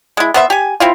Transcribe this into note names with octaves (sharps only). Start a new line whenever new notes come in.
G#3 E4
B3 C5 E5
G4 G#5
C4 E4 F4